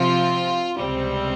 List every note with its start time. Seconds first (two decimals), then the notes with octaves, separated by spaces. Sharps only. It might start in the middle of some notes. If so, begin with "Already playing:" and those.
Already playing: C3 F3 C4 F4
0.78 C#2 C3 G3 C4